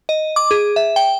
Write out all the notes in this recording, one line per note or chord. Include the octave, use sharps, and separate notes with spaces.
D#5
D6
G#4
E5
G5